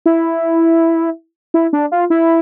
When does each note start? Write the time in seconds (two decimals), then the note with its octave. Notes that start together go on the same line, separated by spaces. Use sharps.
0.06 E4
1.54 E4
1.73 D4
1.92 F4
2.10 E4